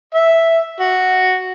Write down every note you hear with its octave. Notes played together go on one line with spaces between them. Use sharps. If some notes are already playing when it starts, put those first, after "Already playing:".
E5
F#4